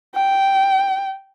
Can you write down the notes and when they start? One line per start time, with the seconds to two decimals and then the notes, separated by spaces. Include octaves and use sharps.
0.16 G5